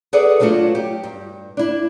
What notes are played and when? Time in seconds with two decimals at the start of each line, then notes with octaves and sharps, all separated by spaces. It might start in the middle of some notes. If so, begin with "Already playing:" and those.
0.13 G#4 A4 B4 D5 E5 F#5
0.40 F#3 A3 D4 F4 F#4
0.75 G4
1.03 G2
1.57 D4 E4